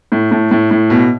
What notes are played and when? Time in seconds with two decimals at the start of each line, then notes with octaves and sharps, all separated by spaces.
0.12 A2
0.31 A2
0.51 A2
0.71 A2
0.90 B2